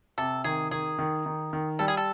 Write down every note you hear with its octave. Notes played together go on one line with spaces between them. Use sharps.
C3 A4
D#3 G#4
D#3 G#4
D#3
D#3
D#3
G3 A4
G#4
A4